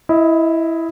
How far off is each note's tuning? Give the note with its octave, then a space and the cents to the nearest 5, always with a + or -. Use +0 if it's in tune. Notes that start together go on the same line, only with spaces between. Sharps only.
E4 +0 D#5 +25